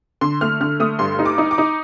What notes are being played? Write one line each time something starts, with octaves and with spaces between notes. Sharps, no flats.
D3 C6
A3 F6
D3 F6
A3 D#6
G2 C6
D#4
D6
D#4
D6
D#4